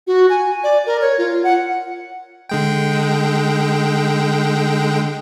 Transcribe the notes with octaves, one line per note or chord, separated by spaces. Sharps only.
F#4
G#5
D5
A#4
C#5
F4
F#5
D3 G#3 G5